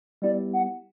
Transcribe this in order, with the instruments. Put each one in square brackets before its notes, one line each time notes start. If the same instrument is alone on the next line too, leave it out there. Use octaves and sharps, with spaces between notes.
[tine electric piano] G3 B3 E4 G4 [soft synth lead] D5
[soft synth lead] F#5